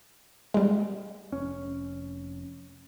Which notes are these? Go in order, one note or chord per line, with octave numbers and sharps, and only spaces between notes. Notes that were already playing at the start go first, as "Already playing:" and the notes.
G3 G#3
F1 C#4